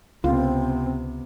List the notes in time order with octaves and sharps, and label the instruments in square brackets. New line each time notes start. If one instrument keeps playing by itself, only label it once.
[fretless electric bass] C#2 [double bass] C3 B3 [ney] C4 [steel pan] F4